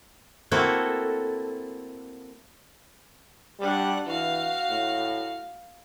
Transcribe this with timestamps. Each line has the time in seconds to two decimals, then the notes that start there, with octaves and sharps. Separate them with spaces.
0.51 A3 A#3 C4 E4 F#4 A4
3.60 G3 D4 F#5
4.07 E3 F#4 F5
4.70 A2